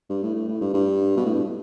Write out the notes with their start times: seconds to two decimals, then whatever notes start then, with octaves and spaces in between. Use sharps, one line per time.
0.10 G2
0.23 A2
0.35 A2
0.48 A2
0.61 G2
0.74 G2
1.17 B2
1.25 A2
1.34 G2